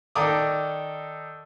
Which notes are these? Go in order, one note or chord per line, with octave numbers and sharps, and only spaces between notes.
D#3 A4 D5 A#5 D6 D#6